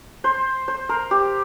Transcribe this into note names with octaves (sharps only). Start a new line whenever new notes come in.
C5
C5
A#4
G4